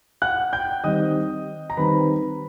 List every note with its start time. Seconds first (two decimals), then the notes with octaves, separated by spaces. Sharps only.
0.22 F#5 F#6
0.53 G5 G6
0.84 D#3 G3 C4 D#5 D#6
1.70 A#5
1.77 D#3 G3 C4 B4 B5